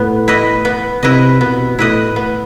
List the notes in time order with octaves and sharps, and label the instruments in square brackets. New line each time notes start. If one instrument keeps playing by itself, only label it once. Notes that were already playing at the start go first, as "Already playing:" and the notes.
Already playing: [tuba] A2 [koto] B3
[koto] E4 B4 D#5
B3
[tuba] C3 [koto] E4 B4 D#5
[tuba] B2 [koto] B3
[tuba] A2 [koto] E4 B4 D#5
[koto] B3